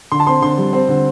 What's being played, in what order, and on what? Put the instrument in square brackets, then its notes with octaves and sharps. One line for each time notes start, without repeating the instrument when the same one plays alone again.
[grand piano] D3 C6
A5
C4 C6
D3 C6
G3
C4
D3